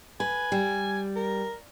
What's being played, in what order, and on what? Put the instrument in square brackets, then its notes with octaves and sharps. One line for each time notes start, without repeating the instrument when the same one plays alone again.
[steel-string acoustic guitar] B4 [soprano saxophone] G#5
[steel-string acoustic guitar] G3
[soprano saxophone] A#4